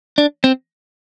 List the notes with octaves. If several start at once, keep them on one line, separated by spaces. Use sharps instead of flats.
D4
C4